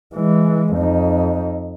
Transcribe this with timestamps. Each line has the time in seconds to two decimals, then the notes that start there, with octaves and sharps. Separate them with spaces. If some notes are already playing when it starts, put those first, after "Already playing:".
0.16 E3 G#3
0.75 F2 D#4